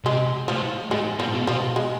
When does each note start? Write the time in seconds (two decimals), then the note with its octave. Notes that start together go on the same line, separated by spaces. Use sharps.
0.05 C3 G#3
0.48 A2 F3
0.91 A2 G#3
1.19 B2 F3
1.28 A2
1.35 B2
1.47 B2 F3
1.76 G#3